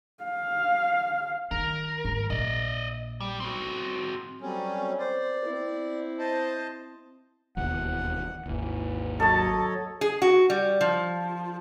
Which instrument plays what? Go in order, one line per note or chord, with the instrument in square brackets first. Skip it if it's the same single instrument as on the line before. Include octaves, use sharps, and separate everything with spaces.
[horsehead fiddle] F5
[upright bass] D#3 [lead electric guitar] A#4
[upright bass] G#2
[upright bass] A#1 [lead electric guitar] D5 D#5
[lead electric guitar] G3
C4 F#4
[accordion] F#3 G3 C#4 [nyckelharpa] C4 A4
[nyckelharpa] C5 [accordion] D5
[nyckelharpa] C4 E4
[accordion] C5 D#5 A5
[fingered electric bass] E1 D#2 E3 [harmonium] F#5
[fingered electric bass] G#1 D#2 [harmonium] E3
[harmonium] F#3 C#5 D#5 [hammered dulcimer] A4 A5
[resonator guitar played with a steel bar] G#4
F#4
G3
F3